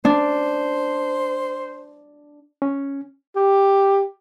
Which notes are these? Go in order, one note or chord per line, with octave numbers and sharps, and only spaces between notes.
D4 C5
C#4
G4